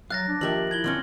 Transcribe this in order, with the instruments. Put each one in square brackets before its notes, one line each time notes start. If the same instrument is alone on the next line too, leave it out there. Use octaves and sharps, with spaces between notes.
[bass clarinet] F#3 [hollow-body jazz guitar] F5 [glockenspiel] F#6 A6 A#6
[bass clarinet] D4
[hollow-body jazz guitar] D#2 G4 E5 [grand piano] F3 A#4 [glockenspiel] F#7
[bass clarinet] E4 [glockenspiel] G#6 F#7 G7
[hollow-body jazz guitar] D3 C4 C#4